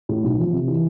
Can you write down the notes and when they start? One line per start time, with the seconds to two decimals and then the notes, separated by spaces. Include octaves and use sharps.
0.09 A2
0.24 B1
0.39 F3
0.52 C3
0.68 E3